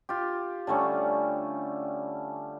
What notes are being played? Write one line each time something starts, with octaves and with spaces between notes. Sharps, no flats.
F4 G4
D3 G3 A3 C#4